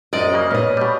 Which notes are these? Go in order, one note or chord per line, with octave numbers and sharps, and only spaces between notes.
A#1 F#2 D5 D#5
C#3 A#3
A#2 B4 C#5 D#5 F6
B2 G3